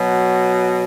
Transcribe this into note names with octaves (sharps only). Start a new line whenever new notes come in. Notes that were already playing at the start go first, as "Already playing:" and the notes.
Already playing: B2 F#3